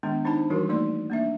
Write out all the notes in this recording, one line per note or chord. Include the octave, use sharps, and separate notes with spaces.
D#3 G#3 B3 D4
D4 D#4 C5 A5 B5
E3 G3 E4 F#4 A#4
A3 A#3 D#4 D5 C6
A#3 D4 E5